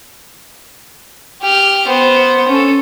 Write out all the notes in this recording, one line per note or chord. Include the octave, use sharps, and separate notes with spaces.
G4 F6
B3 C5
C#4 A4